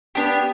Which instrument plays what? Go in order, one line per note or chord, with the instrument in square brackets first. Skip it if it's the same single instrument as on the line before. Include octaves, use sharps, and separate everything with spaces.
[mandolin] B3 D4 G4